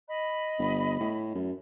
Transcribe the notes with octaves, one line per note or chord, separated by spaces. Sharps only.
D#5 B5
G1
A2
F#2